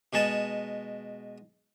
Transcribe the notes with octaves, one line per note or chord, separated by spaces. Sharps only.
B2 G#3 A5